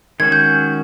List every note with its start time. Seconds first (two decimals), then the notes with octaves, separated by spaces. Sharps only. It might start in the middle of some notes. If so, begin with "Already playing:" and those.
0.20 D#3 G#3 C#4 F#4 G#6
0.32 G6